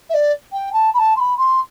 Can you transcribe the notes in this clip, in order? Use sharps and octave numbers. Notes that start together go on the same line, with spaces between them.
E5
D5
G5
A5
B5
A5
C6
B5
C6